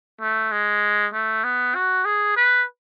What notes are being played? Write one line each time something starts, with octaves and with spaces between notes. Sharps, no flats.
A3
G#3
A3
B3
F#4
G#4
B4